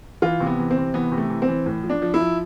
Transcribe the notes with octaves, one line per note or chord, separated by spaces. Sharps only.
E3 F4
C3
B3
E3
C4
C3
E3 B3
C3
A3
E3
C4
E3
A2
F3
D4
F3
E4
F3